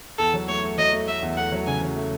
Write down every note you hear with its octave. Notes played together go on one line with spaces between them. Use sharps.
E2 A4
F#3
A3 C#5
A3
F#3 D#5
A3
A3 E5
E2
A3 F#5
F#3
C#3 G#5
F#3
A3